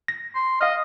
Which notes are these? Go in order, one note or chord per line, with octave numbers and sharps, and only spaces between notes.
A#6
C6
D#5 F5 F6